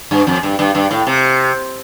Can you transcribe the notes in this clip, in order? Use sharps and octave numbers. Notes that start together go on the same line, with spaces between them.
G2
F2
G2
G2
G2
A2
C3